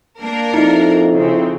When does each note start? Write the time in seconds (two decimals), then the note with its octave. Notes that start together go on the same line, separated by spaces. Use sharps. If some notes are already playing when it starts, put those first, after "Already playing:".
0.19 A#3 D4 A#4
0.54 F2 D#4 E4 E5
1.14 C#3 C4